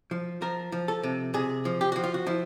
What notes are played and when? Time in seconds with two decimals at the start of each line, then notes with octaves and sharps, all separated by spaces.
0.11 F3
0.42 F3 A#4
0.72 F3
0.88 A4
1.03 C3
1.34 C3 G#4
1.65 F3
1.81 G4
1.92 F3 F#4
2.04 F4
2.14 F#4
2.27 F3 E4